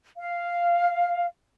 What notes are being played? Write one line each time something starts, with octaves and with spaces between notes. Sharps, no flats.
F5